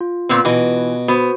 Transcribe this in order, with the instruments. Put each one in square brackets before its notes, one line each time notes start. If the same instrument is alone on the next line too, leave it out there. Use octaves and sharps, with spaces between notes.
[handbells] F4
[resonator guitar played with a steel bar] A#2 B3 C4
[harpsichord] B2 [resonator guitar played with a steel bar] E3
[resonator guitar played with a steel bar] B3 [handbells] F#4 C5